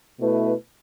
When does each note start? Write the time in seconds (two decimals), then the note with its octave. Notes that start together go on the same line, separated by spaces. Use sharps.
0.19 B2 A3 E4 B4